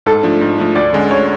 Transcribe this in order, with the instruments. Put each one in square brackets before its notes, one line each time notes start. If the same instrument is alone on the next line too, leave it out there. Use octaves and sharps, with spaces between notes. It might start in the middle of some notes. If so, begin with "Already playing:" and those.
[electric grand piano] G#2 [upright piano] A4
[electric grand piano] F3 A3 D4
G#2
F3 A3 D4
[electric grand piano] D2 [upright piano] D5
[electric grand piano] D3 G#3 C#4
[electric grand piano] D2 [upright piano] C#5